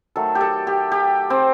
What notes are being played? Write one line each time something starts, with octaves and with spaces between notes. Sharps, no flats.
D#3 F#3 A3 A4
G4
A4
G4
G4
C4